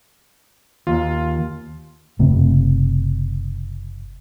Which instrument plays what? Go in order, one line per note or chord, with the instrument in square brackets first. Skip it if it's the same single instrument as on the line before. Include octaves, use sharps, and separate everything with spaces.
[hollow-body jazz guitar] D#2 [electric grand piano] F4
[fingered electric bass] F#1 C3 A3